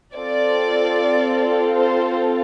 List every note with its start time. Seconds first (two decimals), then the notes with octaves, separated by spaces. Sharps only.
0.16 C4 F4 A4 D5
1.78 C5